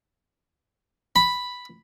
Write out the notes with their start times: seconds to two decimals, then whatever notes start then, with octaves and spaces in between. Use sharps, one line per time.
1.16 B5